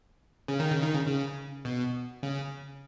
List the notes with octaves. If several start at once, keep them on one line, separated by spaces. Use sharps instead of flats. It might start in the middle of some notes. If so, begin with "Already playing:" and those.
C#3
D#3
C#3
D#3
C#3
C#3
B2
C#3